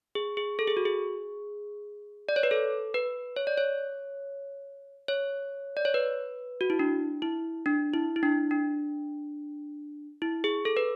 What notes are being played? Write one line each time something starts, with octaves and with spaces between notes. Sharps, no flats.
G#4
G#4
A4
G#4
F#4
G#4
D5
C#5
B4
A4
B4
C#5
D5
C#5
C#5
D5
C#5
B4
F#4
E4
D4
E4
D4
E4
E4
D4
D4
E4
G#4
A4
B4